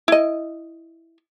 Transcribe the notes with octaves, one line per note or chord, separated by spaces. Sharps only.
E4 D#5